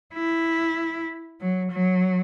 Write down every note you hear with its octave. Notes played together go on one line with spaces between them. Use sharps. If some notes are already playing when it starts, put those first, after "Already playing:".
E4
F#3
F#3